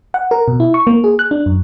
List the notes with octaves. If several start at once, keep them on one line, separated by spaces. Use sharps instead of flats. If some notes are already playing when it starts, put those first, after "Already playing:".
F#5
A#4
B2
E4
C#6
A#3
G#4
F#6
D4
F#2